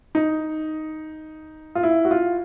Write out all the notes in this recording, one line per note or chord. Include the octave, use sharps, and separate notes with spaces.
D#4
F4
E4
F#4
F4